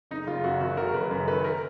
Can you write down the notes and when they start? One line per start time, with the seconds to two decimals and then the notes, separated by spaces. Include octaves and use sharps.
0.11 F#1 D#4
0.27 F#1 F4
0.44 F#2 F#4
0.61 D#3 F#4
0.77 F#1 A#4
0.94 F#1 B4
1.11 F#2
1.27 D#3 B4
1.44 A#4